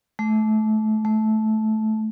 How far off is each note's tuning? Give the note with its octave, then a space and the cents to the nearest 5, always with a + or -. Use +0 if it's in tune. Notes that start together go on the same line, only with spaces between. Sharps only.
A3 -25
A3 -15